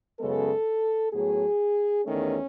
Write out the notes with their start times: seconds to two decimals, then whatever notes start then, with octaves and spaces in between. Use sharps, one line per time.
0.20 F#2 C#3 G#3 B3 A4
1.13 A2 F#3 B3 G#4
2.06 E2 D#3 A3 C#4